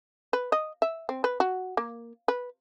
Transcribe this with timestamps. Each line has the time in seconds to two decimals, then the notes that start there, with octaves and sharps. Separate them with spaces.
0.33 B4
0.52 D#5
0.82 E5
1.09 C4
1.24 B4
1.40 F#4
1.77 A#3
2.28 B4